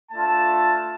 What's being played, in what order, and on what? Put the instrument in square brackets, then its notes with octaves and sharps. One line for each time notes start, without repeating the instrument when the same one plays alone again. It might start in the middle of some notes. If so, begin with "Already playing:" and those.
[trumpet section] A3 D4 F4 A5